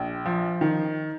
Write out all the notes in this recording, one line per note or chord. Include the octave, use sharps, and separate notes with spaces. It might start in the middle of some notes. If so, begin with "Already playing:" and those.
Already playing: A#1
F3
D#3